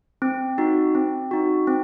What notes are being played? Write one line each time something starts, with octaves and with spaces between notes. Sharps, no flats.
C4
D#4 F#4
C4
D#4 F#4
C4